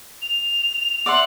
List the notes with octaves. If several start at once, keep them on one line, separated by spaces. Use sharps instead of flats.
F7
D5 E5 F#5 C6